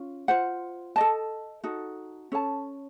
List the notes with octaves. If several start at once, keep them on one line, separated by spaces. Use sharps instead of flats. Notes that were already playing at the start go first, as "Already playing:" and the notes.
Already playing: C#4 F4
F4 C5 F#5
A4 D#5 A5
D#4 F#4 A4
C#4 A4 C#5 A5